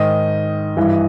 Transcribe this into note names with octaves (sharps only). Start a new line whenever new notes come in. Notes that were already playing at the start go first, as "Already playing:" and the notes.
Already playing: G#2 D#3 D#5
G2 E3